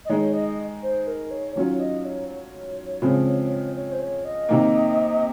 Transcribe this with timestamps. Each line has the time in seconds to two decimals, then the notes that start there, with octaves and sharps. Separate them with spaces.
0.05 D#5
0.09 D#3 G#3 D#4 C#5
0.33 D#5
0.83 C5
1.07 A#4
1.31 C#5
1.56 D#3 F#3 C#4 F4 C#5
1.80 D#5
2.05 C#5
2.29 C#5
3.02 C#3 F3 G#3 C4
3.76 C#5
3.92 C5
3.99 C#5
4.25 D#5
4.49 C3 D#3 A#3